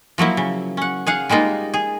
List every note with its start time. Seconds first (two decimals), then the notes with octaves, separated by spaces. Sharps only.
0.18 F3 F#3 A#3 E4
0.37 C#3
0.77 C#4 F#5
1.07 G#4 F5 F#5
1.29 G3 G#3 A#3 D#4 F4
1.74 G#4